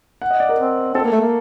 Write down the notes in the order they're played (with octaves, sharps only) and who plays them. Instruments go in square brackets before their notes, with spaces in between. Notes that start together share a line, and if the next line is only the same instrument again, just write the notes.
[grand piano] F#5
D#5
D5
A#4
[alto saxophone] C4
[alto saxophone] C4 [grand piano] A4
[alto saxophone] A#3
A3
A#3